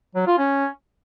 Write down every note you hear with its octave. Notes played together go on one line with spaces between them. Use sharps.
F#3
F4
C#4